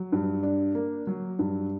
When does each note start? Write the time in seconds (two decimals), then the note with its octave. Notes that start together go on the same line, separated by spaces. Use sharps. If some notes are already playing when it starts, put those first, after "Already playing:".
Already playing: F#3
0.12 G2
0.43 D4
0.75 A#3
1.07 F#3
1.39 G2